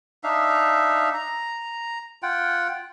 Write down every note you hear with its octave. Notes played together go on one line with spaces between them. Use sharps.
D4 D#4 E5 F5
A#5
F4 F#5 G5